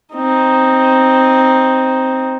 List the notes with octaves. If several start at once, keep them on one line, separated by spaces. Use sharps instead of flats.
C4 D#4